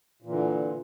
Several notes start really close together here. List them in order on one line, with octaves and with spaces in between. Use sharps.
A#2 E3 D3